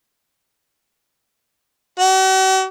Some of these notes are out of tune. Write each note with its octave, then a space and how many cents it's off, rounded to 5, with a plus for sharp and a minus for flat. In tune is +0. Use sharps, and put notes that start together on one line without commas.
F#4 +45